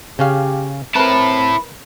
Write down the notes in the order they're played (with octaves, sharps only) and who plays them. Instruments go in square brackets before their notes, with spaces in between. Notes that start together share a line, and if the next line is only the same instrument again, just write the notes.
[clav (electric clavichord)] C#3 C#4 F5 [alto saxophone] G4
[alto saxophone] C4 [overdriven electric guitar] E4 A5 [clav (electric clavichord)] A#4 B4 [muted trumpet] B5